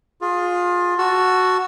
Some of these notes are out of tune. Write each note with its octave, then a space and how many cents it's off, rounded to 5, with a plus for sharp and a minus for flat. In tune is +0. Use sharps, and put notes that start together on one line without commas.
F4 +25 G#4 +0
F#4 +0 A5 +0 E6 +30